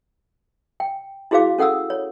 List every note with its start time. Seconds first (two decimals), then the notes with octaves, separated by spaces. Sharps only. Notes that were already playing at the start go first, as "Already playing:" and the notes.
0.80 G5
1.31 E4 F#4 G#4 C5 F5 D6
1.58 C#4 A4 F#5 D#6 E6
1.90 C#5